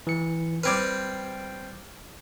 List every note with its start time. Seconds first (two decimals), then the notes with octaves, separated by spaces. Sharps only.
0.07 E3 C#7
0.63 G3 C4 B4 F6 G#6